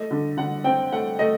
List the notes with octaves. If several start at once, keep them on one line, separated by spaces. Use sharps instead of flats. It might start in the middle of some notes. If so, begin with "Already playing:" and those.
Already playing: A3 D#5
D3
D3 F#5
C4 G5
A3 F#5
A3 D#5